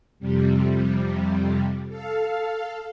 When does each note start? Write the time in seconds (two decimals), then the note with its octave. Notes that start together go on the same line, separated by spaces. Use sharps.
0.19 F2 C3 G3
1.88 A4 F5